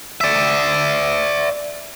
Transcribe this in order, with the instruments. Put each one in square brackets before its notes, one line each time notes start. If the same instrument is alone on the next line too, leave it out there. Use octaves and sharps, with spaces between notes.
[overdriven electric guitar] D5 E5